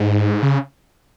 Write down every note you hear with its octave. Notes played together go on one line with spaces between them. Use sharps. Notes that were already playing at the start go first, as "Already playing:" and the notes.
Already playing: G#2
C#3